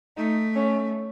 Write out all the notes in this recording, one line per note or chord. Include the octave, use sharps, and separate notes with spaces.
A3 D#4
C#4